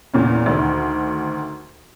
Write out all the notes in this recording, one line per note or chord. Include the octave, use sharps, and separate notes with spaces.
E2 A#2 C#4
D2 D#3